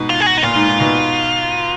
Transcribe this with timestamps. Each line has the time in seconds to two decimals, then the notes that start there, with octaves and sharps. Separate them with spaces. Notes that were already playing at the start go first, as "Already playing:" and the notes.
Already playing: G#2 B2
0.10 F4
0.20 G#4
0.26 F#4
0.37 D#4
0.43 A#2 F4
0.55 G#2
0.68 G#2
0.79 G#2 B2